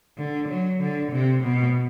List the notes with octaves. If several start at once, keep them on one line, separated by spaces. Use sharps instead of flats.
D3
F#3
D3
C3
B2